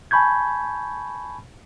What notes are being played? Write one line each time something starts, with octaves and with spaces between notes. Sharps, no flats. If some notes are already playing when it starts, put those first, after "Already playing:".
G#5 A5 B5 C#6 G6 G#6